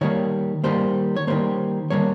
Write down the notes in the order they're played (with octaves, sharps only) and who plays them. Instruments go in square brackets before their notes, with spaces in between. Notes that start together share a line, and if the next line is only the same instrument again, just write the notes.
[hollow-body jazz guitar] D#3 G3 A#3 C#5
D#3 G3 A#3 C5
C#5
D#3 G3 A#3 C5
D#3 G3 A#3 C#5